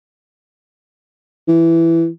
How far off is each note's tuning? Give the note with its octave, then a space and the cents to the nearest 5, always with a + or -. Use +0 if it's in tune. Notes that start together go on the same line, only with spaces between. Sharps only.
E3 +10